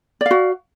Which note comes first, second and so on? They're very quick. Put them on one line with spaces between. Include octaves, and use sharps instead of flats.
D5 F5 F#4